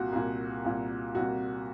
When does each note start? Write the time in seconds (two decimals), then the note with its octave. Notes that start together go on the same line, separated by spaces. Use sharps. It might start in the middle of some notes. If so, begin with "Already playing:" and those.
Already playing: C2 A#2 F#4
0.12 C2 A#2
0.64 C2 A#2
1.15 C2 A#2 F#4